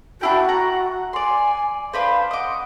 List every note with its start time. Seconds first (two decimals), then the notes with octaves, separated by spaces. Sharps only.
0.21 D4 E4 F#4 G5
0.48 F#5 A#5
1.13 D5 G#5 C6
1.93 D4 B4 C5 F5
2.31 D#5 F#5 D6